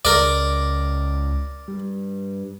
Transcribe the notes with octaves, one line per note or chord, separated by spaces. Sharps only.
C#2 A#4 D5
G2